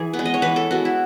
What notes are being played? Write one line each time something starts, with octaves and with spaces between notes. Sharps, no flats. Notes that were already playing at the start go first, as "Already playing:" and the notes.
Already playing: E3 G#4
B3
G#3
D#5
C#5
E3 B4
A4
G#3 B3 F#4
E4